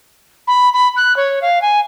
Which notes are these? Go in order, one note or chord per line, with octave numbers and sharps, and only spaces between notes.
B5
B5
F#6
C#5
F5
G#5